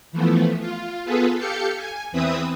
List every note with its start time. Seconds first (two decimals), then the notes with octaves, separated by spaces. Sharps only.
0.12 E3 F3 A3 B3
0.60 F4
1.05 B3 F4 G#4 A4 B4
1.38 G4 A4 F5 G6 C#7
1.77 G#5
2.12 E2 E3 C4 B4 E5 D#6